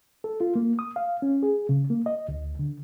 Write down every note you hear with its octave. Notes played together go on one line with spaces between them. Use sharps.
A4
F4
A#3
D#6
F5
C#4
G#4
C#3
A#3
D#5
D2
D3